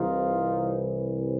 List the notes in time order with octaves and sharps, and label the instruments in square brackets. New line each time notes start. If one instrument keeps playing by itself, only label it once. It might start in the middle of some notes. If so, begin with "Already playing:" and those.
Already playing: [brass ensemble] C2 C3 E3 D#4 F4